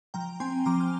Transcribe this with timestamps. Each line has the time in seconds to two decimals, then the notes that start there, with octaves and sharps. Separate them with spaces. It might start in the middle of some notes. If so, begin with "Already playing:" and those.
0.14 F3 G5 A#5
0.40 C4 G#5 C6
0.66 F3 A#5 D6
0.80 F6